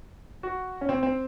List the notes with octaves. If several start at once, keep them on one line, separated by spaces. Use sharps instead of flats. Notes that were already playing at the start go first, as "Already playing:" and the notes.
F#4
C#4
C4
C4